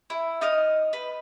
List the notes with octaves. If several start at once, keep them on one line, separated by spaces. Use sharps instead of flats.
E4
D#4 D#5 D#6 F6
B4